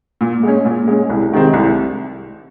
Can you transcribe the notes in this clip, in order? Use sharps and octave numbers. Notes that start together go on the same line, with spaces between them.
A#2
G#3 C#4
A#2
G#3 C#4
C2
C3 D#3 G#3 C4
C2